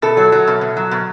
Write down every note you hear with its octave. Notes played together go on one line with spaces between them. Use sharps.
B2 A4
F#3
F#3
B2
B2
F#3
B2